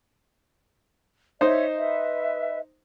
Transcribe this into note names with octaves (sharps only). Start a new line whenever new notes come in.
D#4 C5 C#5 D#5 E5
B4 E5